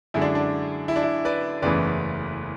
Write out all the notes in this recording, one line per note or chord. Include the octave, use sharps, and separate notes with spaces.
F#2 D3 G#3 E4
D4
D4
E4
D4
E4
B4 D5
F#1 E2 C#3 E3 A3 B4 D5